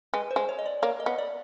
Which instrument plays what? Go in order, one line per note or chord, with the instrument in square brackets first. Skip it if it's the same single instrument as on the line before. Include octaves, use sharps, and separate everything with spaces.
[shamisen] G#3 [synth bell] B4
[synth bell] C5
[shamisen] G#3
[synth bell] C#5
D#5
D5
[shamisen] A#3 [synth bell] C#5
[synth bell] D#5
[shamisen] B3
[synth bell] D5